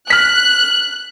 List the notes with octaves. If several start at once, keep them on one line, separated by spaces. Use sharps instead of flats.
F6 F#6 B6